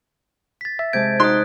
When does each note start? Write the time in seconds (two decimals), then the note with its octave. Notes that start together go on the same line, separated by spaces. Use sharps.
0.61 A6 B6
0.79 E5
0.93 C3 G#3 A5 G6 G#6 D7
1.20 D#4 C6 D#6 F#6